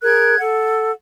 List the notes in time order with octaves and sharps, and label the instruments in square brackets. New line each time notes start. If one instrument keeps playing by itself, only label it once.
[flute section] G#4 A#4 F#6 G#6
A4 F#5